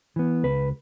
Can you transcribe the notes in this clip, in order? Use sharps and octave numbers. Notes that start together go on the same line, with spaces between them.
E3 B3
C#2 B4